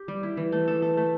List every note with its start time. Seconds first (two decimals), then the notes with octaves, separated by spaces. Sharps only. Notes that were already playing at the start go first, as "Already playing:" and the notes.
Already playing: G4
0.08 G3
0.23 E4
0.37 E3
0.52 A3
0.68 A4
0.82 A4
0.97 A3